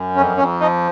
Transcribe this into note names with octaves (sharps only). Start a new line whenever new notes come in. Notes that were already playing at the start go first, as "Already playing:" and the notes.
Already playing: F#2
F2 C#4
F2 C#4
F3 D#4